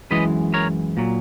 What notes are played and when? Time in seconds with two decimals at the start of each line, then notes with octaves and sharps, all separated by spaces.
0.11 F#2 E3 G#3 B4 D#5
0.54 A#4 C#5
0.97 A#2 F#3